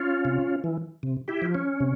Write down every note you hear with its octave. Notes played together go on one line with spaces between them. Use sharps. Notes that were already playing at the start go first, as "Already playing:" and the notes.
Already playing: C#4 F4
C3
E3
C3
E4 G4
F3
C#4
C3